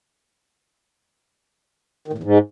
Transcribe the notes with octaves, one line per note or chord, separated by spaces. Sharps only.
D#3
A2
E2
G#2